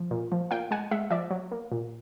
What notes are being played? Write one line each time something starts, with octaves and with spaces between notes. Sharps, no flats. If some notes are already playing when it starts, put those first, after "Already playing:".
Already playing: F3
A#2
F3
A#2 F5 G5
G#3 F#5 G#5
G#3 E5 F#5
F3 D5 E5
F#3
A#3
A#2